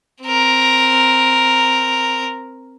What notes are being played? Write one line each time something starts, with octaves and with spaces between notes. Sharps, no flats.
C4 A#4